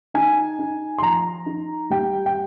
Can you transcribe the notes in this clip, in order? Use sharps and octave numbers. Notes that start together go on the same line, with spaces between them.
D#4 G#5
D#4
C6
F3 A#5
D#4
G3 G5
G5